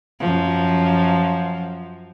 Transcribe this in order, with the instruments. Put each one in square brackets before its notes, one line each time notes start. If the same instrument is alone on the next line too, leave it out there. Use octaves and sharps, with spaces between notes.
[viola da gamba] F#2 F3